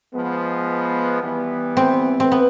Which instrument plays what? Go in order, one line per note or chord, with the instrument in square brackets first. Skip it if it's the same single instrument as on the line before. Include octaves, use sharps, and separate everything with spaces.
[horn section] F3 G#3 B3
E3 G3 B3
[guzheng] C4
C4
B3